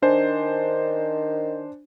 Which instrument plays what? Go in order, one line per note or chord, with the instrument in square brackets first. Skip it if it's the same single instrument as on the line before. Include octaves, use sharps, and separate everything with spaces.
[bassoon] D#3 [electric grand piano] D4 C5 G#5